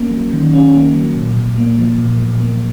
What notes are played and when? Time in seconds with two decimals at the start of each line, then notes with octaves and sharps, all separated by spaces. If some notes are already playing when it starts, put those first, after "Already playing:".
Already playing: A#3 C#4
0.11 F#3
0.33 D#3
0.54 C#4
0.74 A#3
0.94 F#3
1.16 A#2
1.37 A#2
1.58 A#3
1.79 F3
1.98 A#2
2.20 A#2
2.40 A#3